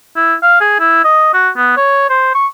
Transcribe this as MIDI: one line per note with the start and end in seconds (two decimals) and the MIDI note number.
0.16 0.34 64
0.43 0.60 77
0.61 0.76 68
0.80 1.00 64
1.04 1.30 75
1.34 1.50 66
1.57 1.76 59
1.77 2.09 73
2.10 2.30 72
2.35 2.47 85